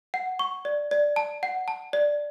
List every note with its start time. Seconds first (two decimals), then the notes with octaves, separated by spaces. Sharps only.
0.14 F#5
0.39 C#6
0.65 D5
0.91 D5
1.16 A5
1.43 F#5
1.68 A5
1.93 D5